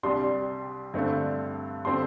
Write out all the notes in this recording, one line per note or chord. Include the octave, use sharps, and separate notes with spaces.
C2 C3 G3 D4 C6
G2 D3 A3 C4
D3 G3 C4 C6